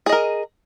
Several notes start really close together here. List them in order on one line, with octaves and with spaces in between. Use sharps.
G#4 D#5 A#4